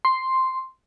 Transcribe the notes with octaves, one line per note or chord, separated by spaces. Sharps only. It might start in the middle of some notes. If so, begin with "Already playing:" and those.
C6